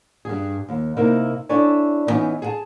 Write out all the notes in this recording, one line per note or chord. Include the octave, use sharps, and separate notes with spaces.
G2 G#4
D#2
C3 A#3 D#4 E4 A#4
D4 E4 A4 C#5 D5 G#5
D3 E3 B3 C#4 D#4
G#4 F#5 A5